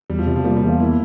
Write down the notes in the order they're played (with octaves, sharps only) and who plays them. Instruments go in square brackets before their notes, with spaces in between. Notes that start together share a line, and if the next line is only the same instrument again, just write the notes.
[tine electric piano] E2 [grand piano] G3
[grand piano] F3
[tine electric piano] C3 [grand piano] G3
[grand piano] F3
[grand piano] G3 [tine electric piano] A#3
[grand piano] G3
[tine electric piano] E2
[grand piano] F4
[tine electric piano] A#3 [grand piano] E4